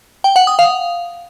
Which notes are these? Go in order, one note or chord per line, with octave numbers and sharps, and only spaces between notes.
G5
F#5
D#6
F5